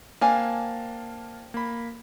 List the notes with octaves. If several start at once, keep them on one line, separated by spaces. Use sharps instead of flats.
A#3 C4 D4 F5 G#5 A5
A#3 B5